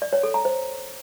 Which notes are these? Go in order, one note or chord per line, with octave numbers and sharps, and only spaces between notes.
D5
C#5
A4
A#5
C5